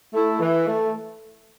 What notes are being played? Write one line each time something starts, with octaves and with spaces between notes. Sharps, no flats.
A3 E4
E3
A3